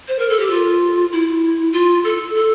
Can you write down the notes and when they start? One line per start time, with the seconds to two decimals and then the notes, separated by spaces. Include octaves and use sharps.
0.07 C5
0.18 A#4
0.29 A4
0.39 G4
0.50 F4
1.12 E4
1.72 F4
2.04 A4
2.34 A4